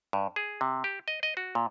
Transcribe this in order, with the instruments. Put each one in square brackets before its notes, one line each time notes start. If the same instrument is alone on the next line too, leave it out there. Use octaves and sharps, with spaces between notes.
[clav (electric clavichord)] G2
G#4
C3
G4
D#5
D#5
F#4
A#2